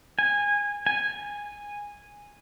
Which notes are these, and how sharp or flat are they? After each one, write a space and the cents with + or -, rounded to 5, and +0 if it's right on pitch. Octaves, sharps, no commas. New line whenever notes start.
G#5 -20
G#5 -10